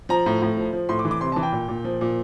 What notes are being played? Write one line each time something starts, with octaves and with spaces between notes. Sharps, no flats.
F3 A#5
A2
A2
F3
F3
A2 C6
D6
E3
D6
C3 C6
A5
E3
G5
A#2
A#2
F3
A#2